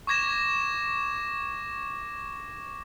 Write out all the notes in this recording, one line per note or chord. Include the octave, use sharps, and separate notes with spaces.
C#6 D6 G#6 A#6 E7